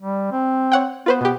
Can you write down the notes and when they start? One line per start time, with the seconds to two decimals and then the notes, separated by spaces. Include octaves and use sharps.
0.02 G3
0.31 C4
0.72 C#5 F#5 G5
1.06 B3 F4 B4 C5
1.21 B2 B3 G4